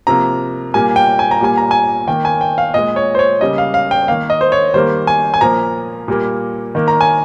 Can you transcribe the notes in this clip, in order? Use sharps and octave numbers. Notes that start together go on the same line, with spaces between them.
C3 F3 A#3 A#5
A#2 G3 A#3 G#5
G5
G#5
A#5
A#2 G3 A#3 G#5
A#5
G#5
D#3 A#3 G5
G#5
G5
F5
A#2 G#3 D#5
C#5
C5
C#5
C#3 G3 A#3 D#5
F5
F5
G5
D#3 A#3 F5
D#5
C5
C#5
D#3 G3 A#3 C5
G#5
G#5
A#2 F3 A#3 A#5
A#2 G3 A#3
D#3 A#3
A#5
G#5